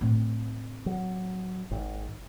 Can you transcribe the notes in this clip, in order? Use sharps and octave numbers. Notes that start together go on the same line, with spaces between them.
A2 C4
F#3
G#1